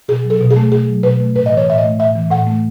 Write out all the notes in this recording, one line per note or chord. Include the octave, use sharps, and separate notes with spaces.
B2 G#4
F#3
A4
B2
G#4
A3
B2 G#4
F#3
B2 B4
A3
A2 B4
D#5
E3 C#5
A2 E5
D#5
A3
A2 E5
E3
A2 F#5
A3